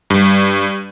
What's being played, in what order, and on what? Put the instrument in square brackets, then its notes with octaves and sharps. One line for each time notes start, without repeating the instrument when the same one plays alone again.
[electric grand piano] G2